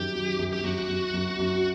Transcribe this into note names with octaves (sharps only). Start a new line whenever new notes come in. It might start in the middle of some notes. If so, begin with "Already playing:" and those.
Already playing: F#2 D#3 G4
F#3
F#2
G4
F#2 F#4
F#2
F#2
F#2